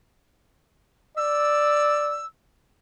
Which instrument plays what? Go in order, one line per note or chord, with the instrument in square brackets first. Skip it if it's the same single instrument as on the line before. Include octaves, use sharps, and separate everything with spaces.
[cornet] D5 [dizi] E6